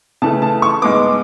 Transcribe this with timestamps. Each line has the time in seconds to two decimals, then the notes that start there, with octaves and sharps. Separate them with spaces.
0.22 C#3 E3 A3 A5
0.42 A5
0.62 C#6
0.82 G#2 G#3 B3 D6